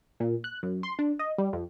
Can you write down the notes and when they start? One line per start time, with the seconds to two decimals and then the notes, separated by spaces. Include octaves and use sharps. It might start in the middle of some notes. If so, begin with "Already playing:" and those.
0.20 A#2
0.44 F#6
0.63 F#2
0.83 C6
0.99 D4
1.19 D#5
1.38 G3
1.53 F2